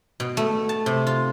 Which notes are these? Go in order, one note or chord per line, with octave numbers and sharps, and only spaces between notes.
B2
A3
A5
C3
F4